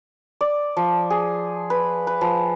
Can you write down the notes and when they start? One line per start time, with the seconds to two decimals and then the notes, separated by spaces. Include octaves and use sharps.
0.41 D5
0.77 F3
1.10 G#4
1.70 B4
2.07 B4
2.21 F3